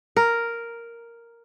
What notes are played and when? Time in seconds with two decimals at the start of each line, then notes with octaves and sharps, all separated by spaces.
0.17 A#4